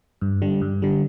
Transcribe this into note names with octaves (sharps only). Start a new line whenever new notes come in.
G2
D3 G3
G2
D3 G3